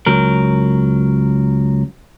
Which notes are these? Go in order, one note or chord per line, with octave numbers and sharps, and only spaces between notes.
C#2 F#3 A#4